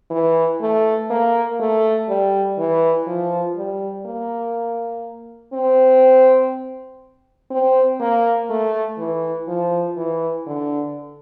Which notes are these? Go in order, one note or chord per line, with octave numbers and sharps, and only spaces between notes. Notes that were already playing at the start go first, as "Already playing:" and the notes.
E3
A3
A#3
A3
G3
E3
F3
G3
A#3
C4
C4
A#3
A3
E3
F3
E3
D3